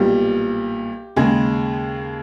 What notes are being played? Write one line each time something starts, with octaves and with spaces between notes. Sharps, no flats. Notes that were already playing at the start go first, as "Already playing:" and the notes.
Already playing: B1 A#2 G3 G4
D#2 C#3 G#3 G#4